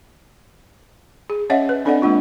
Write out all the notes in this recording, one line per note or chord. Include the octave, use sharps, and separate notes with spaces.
G#4
C#4 C#5 D#5 E5 F#5
B4
C4 D4 A4 D5 D#5 F#5
G#3 A#3 D4 F4